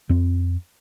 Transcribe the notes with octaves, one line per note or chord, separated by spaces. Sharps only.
F2 C4